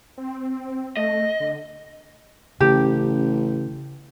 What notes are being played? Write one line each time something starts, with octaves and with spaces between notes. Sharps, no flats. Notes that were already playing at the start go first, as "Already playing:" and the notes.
C4
A3 D#5
D3
A1 C#3 G4